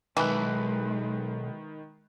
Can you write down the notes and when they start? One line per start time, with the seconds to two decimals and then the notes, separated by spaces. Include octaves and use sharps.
0.17 B1 D#3 E3 G#3 B5 F#6